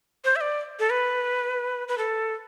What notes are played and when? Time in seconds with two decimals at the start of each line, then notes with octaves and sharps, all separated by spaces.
0.24 C5
0.36 E5
0.41 D5
0.79 A4
0.90 B4
1.88 B4
1.98 A4